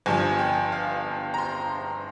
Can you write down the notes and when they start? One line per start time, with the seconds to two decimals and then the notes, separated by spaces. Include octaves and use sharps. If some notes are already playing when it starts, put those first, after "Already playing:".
0.06 G1 G2 F3 G#5
0.39 G5
0.72 F5
1.34 A#5
1.38 C6